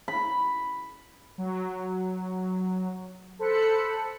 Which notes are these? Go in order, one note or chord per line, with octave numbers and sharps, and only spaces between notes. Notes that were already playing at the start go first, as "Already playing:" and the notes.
B5
F#3
A4 C5 B5 F#6 C#7